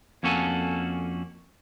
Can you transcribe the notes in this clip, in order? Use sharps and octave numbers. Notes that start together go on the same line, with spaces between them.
F2 A#3 C#4 F#4 A4 G#5